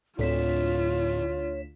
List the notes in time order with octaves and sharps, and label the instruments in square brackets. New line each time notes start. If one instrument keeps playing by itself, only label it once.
[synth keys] D2 B6 E7 [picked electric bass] A2 C4 [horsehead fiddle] F4 [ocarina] C#5